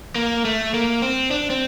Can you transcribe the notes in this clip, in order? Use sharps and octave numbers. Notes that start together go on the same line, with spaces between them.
A#3
A3
A#3
C4
D4
C4